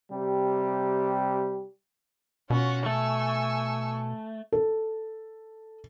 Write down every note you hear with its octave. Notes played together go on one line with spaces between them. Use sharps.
C3 G3 G4
B2 C#4 F4 F#4
A3 G#5 C#6 E6
A4